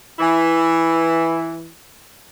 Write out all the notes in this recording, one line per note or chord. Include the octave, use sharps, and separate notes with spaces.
E3 E4